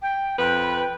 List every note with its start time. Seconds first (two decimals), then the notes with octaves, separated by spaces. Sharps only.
0.02 G5
0.39 F2 B4 G5